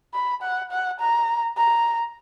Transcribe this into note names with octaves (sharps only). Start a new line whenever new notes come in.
B5
F#5
F#5
A#5
A#5